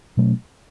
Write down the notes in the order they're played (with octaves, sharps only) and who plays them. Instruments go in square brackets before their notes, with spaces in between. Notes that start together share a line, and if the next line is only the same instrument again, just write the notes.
[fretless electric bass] B2 F#3 A3 C#4